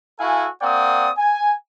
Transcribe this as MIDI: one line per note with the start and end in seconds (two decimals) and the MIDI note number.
0.20 0.48 64
0.20 0.48 66
0.20 0.48 69
0.20 0.48 77
0.20 0.48 80
0.62 1.10 58
0.62 1.10 60
0.62 1.10 74
0.62 1.10 78
0.62 1.10 79
0.62 1.10 87
1.18 1.53 80